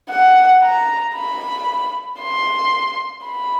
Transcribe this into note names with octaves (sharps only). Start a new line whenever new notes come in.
F#5
A#5
B5
C6
B5